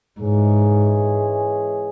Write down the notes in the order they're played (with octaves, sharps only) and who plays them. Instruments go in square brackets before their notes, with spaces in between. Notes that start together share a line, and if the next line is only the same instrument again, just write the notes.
[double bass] G#2 [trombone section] E3 G#3 C#4 G#4